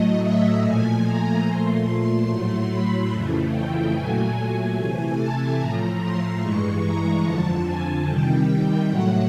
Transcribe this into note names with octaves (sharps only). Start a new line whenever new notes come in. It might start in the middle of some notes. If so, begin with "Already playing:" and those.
Already playing: A2 F#3 A3 D#5
E5
A#2 F3 A3 G#5
A#5
A#2 F3 A3 C6
A2 F#3 A3
B5
F2 C#3 E3 A3
G5
A#2 F#3 A3 G#5
C3 E3 A3
A5
A2 F3 A3 A#5
C6
G2 E3 G#3 C#6
A#5
F2 D3 F3 A5
G#5
C3 D#3 G3 G5
G5
A2 F#3 A3 F#5